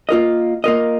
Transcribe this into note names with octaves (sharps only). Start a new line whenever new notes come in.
A#3 F4 A#4 D#5
A#3 F4 A#4 D#5